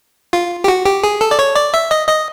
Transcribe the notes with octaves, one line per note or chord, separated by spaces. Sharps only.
F4
G4
F#4
G4
G#4
A4
D5
C#5
D5
E5
D#5
D#5